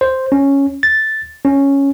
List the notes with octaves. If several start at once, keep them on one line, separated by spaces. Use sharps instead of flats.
C5
C#4
A6
C#4